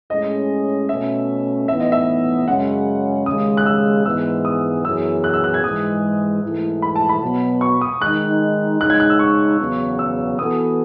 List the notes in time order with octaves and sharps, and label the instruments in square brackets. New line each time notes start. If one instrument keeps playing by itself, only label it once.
[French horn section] A2 G#3 C#4 G#4 [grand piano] D#5
[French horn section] B2 A3 C#4 [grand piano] E5
[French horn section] A2 E3 B3 D#4 [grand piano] E5
[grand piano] D#5
E5
[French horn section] F#2 C#3 G#3 C#4 [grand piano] F#5
[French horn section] D#2 C#3 G#3 [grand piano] D#6
[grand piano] F#6
E6
[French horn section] G#2 E3 G#3 B3 [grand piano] E6
[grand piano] D#6
[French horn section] F#2 E3 B3 E4 G#4 [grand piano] E6
[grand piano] F#6
E6
F#6
G#6
[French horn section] G#2 E3 G#3 [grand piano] D#6
[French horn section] G#2 E3 A3 E4
[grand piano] B5
A5
B5
[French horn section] B2 F#3 B3
[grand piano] C#6
D#6
[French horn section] D#3 G#3 D#4 [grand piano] F#6
[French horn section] C#3 G#3 D#4 [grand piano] F#6
[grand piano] G#6
F#6
E6
C#6
[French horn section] E2 C#3 F#3 B3
[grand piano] E6
[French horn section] E3 B3 F#4 A4 [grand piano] D#6